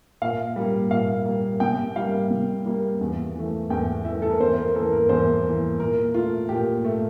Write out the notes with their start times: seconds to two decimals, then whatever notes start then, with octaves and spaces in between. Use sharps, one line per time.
0.22 A#2 F5
0.56 G3 A#3
0.91 A#2 F5
1.26 G3 A#3
1.60 C3 G5
1.96 G3 A#3 F5
2.30 C3
2.66 G3 A#3
3.01 E2
3.36 E3 A3
3.70 E2 G5
4.05 E3 A3 E5
4.22 A4
4.30 A#4
4.40 E2 C5
4.57 A#4
4.75 E3 A#3 A4
4.92 A#4
5.09 E2 C5
5.44 E3 A#3
5.80 A#2 A#4
6.14 A3 F4
6.49 A#2 G4
6.84 A3